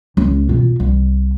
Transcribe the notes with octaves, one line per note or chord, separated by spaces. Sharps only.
C#2
B2 F4
C2